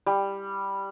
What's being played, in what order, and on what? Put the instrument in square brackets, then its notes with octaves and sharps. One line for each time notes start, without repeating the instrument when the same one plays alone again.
[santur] G3